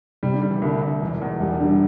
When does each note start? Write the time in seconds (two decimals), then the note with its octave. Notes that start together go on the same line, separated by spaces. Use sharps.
0.23 C3 G3
0.36 D3
0.43 G3
0.49 E3
0.62 C2 D3
0.81 C2
1.01 E1 E3
1.21 E2
1.40 E1 G3
1.60 D3